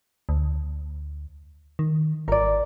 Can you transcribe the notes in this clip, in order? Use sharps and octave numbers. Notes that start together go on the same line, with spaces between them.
D2
D#3
G#1 A#4 D5